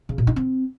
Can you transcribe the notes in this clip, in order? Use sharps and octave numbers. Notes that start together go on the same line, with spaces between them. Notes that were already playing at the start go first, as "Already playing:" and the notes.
C#3
A#2
D#4
C4